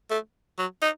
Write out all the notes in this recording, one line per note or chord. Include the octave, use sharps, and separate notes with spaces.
A3
F#3
D#4